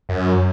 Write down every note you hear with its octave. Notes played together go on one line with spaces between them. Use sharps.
F#2